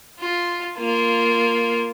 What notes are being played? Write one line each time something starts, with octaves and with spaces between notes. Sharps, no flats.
F4
A#3 F4